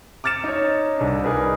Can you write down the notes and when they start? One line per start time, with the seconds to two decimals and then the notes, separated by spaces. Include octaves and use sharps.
0.24 D6 F6 A6 C#7 E7
0.44 D#4 C#5
0.98 C2 D4
1.24 D#4 G#4 A#4 B4